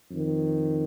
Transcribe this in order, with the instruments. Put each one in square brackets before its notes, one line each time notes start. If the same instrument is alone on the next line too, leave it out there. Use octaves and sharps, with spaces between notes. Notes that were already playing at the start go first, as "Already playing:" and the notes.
[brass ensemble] F2 D#3